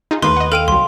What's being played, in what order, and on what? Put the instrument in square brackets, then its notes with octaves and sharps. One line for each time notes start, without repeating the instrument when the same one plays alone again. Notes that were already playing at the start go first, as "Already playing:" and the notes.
[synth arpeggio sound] D#4 F4 G#4
[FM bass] D#2 [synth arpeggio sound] A3 A#3 D#4 [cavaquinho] B4 [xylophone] C6
[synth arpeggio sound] D#5 F#5
[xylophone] A4 G5 D#7 [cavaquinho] F5
[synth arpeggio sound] C2 F#3 [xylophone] C6